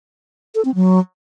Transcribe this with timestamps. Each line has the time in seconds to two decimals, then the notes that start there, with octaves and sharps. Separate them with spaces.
0.55 A4
0.65 C4
0.75 F#3